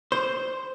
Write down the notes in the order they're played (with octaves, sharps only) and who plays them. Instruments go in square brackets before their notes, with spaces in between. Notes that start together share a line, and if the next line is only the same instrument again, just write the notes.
[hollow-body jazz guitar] C5